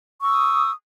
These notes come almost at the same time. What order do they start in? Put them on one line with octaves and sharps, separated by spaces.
C#6 E6 D#6